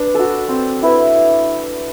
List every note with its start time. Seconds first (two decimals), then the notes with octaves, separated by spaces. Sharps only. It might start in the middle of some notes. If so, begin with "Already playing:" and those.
Already playing: D4 B4
0.15 F#4 A4
0.48 C4
0.83 E4 B4